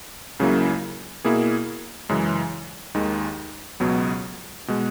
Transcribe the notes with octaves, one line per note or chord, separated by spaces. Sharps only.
C#2 C#3 F#3 A#3 E4
B2 A#3 E4 G#4
F#2 C#3 E3 G#3
D#2 D#3 G#3 D#4
C#2 B2 F#3 B3
B2 G#3